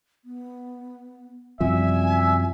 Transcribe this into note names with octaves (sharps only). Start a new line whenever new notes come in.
B3
F#2 C3 F3 G3 E5 G#5